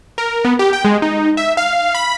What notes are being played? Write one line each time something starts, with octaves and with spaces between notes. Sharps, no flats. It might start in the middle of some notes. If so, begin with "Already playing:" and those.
A#4
B3
G4
G5
G#3
D#4
E5
F5
B5